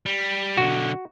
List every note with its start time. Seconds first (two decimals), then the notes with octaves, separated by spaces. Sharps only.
0.06 G3
0.57 B1 D3 F#4